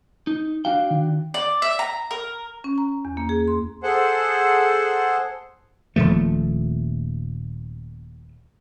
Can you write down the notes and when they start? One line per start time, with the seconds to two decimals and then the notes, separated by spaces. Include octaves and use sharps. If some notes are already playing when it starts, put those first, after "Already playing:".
0.27 D#4
0.65 D4 F#4 F5 G5
0.91 D#3
1.34 D5
1.62 E5
1.79 A#5
2.11 A#4
2.64 C#4
2.78 A#5
3.05 E2
3.17 A#3
3.29 G#4
3.48 C6
3.83 G#4 A4 C5 F#5
5.96 D#1 A#2 F3 A3